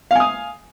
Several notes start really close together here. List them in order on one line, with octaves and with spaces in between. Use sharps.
F5 G#5 D#6